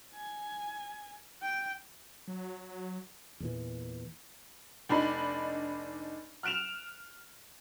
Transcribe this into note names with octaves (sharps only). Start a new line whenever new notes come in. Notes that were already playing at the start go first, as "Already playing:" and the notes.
G#5
G5
F#3
E2 A#2 E3
F1 D4 D#4 B5
F6 F#6 D7 E7 F7